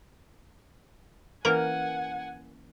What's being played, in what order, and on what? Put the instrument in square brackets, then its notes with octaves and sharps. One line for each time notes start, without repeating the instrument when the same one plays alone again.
[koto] E3 A#3 C#4 [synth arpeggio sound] A#4 [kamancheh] F#5 G#5